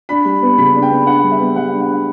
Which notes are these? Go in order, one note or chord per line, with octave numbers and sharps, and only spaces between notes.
D4 B5
G3
B3
C#3 B5
D4
G5
B3
D4 F#5
G3
E5
B3
G3 F#5
D4
F#5
D4